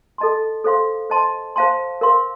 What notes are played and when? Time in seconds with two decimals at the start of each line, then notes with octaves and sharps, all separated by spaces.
0.18 A4 D#5 A5 C6
0.64 A4 C5 F5 C6
1.10 C5 D#5 A5 C6
1.56 C5 F5 A5 C6
2.01 A#4 F5 C6